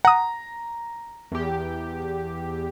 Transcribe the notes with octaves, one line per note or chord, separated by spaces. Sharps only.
F#5 A#5 D#6
E2 G4